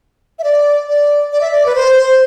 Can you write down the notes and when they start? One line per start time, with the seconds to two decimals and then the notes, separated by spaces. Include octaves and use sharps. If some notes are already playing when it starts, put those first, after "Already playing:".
0.39 E5
0.44 D5
0.89 D5
1.32 D5
1.41 E5
1.51 D5
1.66 B4
1.76 C5
1.98 C5